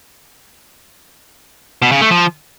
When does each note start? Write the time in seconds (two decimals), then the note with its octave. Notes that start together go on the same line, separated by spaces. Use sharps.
1.82 B2
1.92 C#3
2.01 A3
2.11 F3